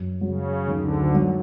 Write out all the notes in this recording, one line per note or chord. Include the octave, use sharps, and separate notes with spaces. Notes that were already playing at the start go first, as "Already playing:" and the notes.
Already playing: F#2
C#3 F#3
D2 D3 D#3
F#3